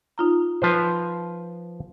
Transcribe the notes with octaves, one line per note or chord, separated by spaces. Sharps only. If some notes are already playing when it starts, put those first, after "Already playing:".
D#4 F4 A#5
F3 B4 C5